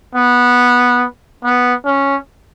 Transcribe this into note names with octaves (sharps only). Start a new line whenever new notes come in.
B3
B3
C#4